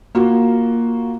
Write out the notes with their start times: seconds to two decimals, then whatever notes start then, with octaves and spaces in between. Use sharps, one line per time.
0.15 A#3 F4 F#4